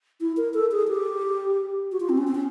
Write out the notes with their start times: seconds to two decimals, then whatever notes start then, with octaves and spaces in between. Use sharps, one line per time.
0.21 E4
0.37 A#4
0.54 A4
0.71 G#4
0.88 G4
1.92 F#4
2.00 F4
2.09 C4
2.18 C#4
2.27 C4
2.35 C#4